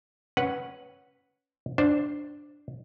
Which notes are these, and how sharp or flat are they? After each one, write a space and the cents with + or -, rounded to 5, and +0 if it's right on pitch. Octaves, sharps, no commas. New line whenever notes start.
C#4 +0 B4 -5 F#5 +0
D4 +0 C5 +0